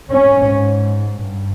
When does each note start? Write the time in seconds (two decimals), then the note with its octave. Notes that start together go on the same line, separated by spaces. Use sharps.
0.12 G#2 C#4
1.24 G2